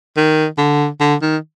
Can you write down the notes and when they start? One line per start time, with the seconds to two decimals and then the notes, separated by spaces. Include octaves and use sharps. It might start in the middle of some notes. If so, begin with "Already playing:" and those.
0.17 D#3
0.58 D3
1.00 D3
1.22 D#3